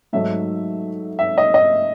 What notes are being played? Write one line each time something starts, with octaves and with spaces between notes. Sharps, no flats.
G#2 F#3 A3 E5
E5
D#5
D#5